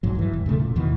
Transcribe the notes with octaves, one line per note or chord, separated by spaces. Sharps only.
A#1 G#2 F#3
G2 E3
E1
G#2 C#3 G3 A3
A#2
D#2 B2 D#3 E3